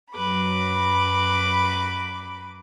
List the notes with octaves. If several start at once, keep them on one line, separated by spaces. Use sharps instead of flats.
F#2 F#3 B4 B5 D6